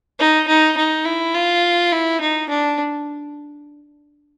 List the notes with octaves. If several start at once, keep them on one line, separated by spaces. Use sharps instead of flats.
D#4
D#4
D#4
E4
F4
E4
D#4
D4